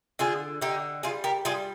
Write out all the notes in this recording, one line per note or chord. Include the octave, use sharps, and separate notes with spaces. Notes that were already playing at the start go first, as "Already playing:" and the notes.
D3 F4 G#4
D3 D#4 G4
G3 F4 G#4
G4 A#4
G3 F4 G#4